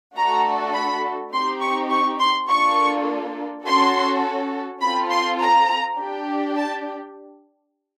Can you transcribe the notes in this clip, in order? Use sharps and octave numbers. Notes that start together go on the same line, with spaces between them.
A3 D4 F#4 A4 A#5
B5
C4 D#4 G4 C6
C#6
C#6
C6
A#3 D4 F4 A4 C#6
C#4 F#4 A4 C6
C4 F4 A4 B5
C6
A#5
D4 G4
A5